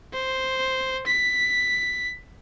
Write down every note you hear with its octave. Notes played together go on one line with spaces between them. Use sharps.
C5
B6